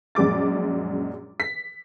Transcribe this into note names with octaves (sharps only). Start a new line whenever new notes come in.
A#1 F#2 G#3 D6 A6
B6